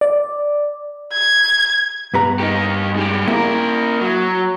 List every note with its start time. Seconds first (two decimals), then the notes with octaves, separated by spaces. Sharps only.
0.01 D5
1.13 G#6
2.14 G2 B3 A#5
2.40 D#4 G4
2.96 G#3 G4
3.28 A#3 E4 A#4
4.01 F#3